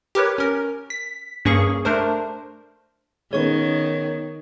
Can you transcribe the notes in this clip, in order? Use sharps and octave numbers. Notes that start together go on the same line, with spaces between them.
G4 A#4 B4 C#5
C#4 A#4
B6
G2 A#3 C#4 G#4 C#6
A3 D4 A#4 C5
D#3 B3 C#4 G#4 C#5 C#6